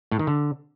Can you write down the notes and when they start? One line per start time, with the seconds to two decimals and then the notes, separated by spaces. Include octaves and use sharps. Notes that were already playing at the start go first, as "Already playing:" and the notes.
0.12 A2
0.19 D#3
0.27 D3